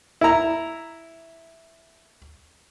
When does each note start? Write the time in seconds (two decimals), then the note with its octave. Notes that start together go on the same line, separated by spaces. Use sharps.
0.21 E4 A#5